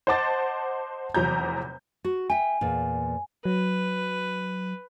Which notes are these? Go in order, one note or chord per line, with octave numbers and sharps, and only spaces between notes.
C5 D#5 F#5 A5 D6 A6
F1 E2 F#3 A#5 G6
F#4
E5 G5 G#5
E2 A#2
F#3 B4